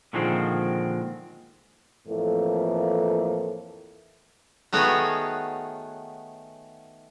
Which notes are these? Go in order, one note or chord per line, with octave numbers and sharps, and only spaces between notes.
A#2 D3 D#3 F3 G#3 C4
F2 A2 E3 A3 A#3
D#3 A3 B3 F#4 G#4 C#5